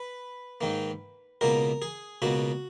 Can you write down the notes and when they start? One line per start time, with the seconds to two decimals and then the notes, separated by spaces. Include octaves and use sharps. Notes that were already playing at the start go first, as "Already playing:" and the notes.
Already playing: B4
0.61 G#2 D#3 A#3
1.41 C#2 B2 A#3 A#4
1.82 G#4
2.22 C#2 B2 A#3 F#4